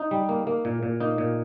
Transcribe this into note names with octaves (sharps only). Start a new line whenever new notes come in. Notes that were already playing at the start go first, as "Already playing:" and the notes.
Already playing: D#4
G3
A#3
A#3
A#2
A#2
A#3 D#4
A#2